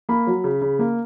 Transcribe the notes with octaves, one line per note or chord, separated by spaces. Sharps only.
A#3 B5
F#3
C#3
C#3
A#3